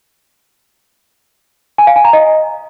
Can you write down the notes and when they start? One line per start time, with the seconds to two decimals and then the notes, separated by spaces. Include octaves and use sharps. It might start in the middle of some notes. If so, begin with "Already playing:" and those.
1.78 G#5
1.87 F5
1.96 G#5
2.05 A#5
2.13 D#5